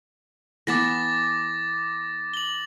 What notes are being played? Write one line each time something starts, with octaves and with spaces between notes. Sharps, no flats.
E3 B3 A5 D6 A6 A#6
F#7 G7